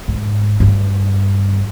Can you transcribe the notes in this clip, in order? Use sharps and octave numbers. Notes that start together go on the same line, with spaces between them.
G#2
G2